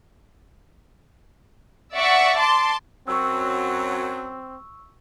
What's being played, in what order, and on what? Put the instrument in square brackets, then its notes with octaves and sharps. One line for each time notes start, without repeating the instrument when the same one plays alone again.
[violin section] D5 E5 F#5 C#6
A5 C6 D6
[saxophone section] F#2 F#3 [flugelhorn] C4 [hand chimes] C#6 E6